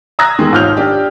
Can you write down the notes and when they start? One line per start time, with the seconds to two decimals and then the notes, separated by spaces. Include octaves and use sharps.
0.19 A#5 D#6 E6 F#6 G#6 A#6
0.39 E2 D#3 G#3
0.52 G#1 F4 C#5 F6 G6 F7
0.77 G3 D4 G4